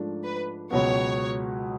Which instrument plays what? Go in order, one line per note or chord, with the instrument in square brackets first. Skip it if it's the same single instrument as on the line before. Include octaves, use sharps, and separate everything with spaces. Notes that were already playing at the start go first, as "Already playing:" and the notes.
Already playing: [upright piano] G#2 F3 A3 D4
[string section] B4
[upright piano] C#2 B2 F#3 B3 [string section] C#5